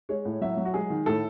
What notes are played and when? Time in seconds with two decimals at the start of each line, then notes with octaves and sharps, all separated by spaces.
0.09 G#3 C#5
0.25 A2
0.41 F#3 E5
0.57 F#3
0.65 F#4
0.74 G#3 G#4
0.90 D#3
1.06 A2 A4